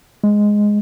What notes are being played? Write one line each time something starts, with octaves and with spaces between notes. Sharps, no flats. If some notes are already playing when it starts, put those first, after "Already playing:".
G#3